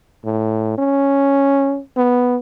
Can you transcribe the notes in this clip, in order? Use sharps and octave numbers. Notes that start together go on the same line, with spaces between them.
A2
C#4
B3